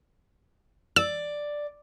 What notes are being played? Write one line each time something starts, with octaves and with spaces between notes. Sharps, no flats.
D5 E6